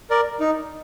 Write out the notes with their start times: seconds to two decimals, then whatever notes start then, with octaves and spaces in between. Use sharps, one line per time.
0.10 A#4 D5
0.40 D#4